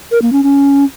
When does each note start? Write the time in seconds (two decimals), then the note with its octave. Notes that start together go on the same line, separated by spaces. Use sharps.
0.11 A#4
0.22 A#3
0.33 C#4
0.43 C#4